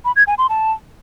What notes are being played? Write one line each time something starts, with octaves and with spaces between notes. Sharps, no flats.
B5
G#6
G#5
C6
A5